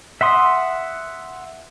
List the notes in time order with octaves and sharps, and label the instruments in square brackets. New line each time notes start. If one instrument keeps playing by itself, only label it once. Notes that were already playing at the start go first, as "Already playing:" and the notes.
[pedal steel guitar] E5 F#5 C6 D#6